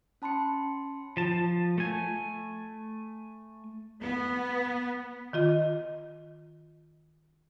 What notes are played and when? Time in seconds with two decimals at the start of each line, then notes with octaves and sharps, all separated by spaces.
0.22 C#4 A5 B5 C6 C#7
1.17 F3 A5
1.78 A3 G#5
4.01 B3
5.33 D#3 F4 D#5